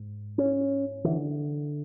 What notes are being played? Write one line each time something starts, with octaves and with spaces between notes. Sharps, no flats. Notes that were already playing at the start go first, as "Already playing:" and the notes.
Already playing: G#2
C#4
D3 E3